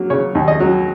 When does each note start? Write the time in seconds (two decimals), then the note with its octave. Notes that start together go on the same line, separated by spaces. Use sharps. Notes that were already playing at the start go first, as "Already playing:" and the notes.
Already playing: F#3 A#3
0.10 C#3 C#5
0.35 D#2
0.48 D#5
0.60 F#3